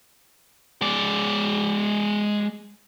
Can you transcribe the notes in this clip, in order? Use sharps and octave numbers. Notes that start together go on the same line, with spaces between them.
G#3 D5